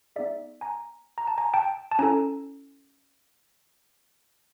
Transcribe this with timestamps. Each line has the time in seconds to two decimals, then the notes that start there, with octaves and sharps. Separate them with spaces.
0.16 B3 D#4 G#4 D5 E5
0.61 G#5 A#5
1.18 A#5
1.27 A5
1.38 G#5 A#5
1.54 G5 A5
1.92 A5
1.99 C#4 E4 A4 G#5 A#5